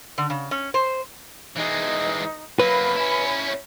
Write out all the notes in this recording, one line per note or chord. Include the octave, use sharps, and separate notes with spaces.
D3
C#3
C#4
C5
E3 G#3 D#4
F#3 A#3 B4 B5
C#4 E4